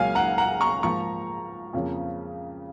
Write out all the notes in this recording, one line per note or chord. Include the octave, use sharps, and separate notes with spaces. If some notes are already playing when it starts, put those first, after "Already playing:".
Already playing: C#2 C#3 F#3 A#3 C#4 F5 G#5
F#5 A#5
F#5 A#5
A#5 C#6
G#2 F3 A#3 A#5 C#6
F2 C#3 F3 A#3 C#4